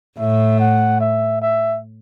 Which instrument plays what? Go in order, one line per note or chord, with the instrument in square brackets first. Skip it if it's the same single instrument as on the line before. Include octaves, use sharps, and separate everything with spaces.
[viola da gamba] A2 [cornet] E5
[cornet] F#5
E5
E5